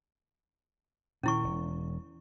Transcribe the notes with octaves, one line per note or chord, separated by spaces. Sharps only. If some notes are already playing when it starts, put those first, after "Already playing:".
A#2 D#3 C#4 E4 C#6
E1